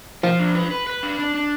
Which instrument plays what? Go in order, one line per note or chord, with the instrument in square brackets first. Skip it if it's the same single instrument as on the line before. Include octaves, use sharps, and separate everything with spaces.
[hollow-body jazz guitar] F3 [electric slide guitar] F4
[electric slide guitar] D4
B4
B4
B4
D4
D4
D4